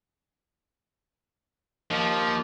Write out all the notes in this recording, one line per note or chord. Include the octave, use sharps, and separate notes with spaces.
F3 A#3 D#4